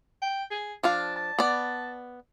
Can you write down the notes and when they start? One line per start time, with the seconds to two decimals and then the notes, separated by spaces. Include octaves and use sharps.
0.22 G5
0.51 G#4
0.83 F3 D4 F5 A5
1.16 A5
1.39 B3 D5